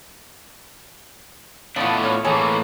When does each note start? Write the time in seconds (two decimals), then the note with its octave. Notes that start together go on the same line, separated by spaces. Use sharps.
1.76 A2 F3 A3 B3 D4
2.03 F4 C#5
2.25 A2 E3 A#3 G#4 A4 C#5